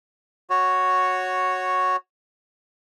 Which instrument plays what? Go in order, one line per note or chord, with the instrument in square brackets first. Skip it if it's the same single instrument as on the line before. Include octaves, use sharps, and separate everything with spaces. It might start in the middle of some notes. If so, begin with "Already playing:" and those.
[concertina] F#4 C#5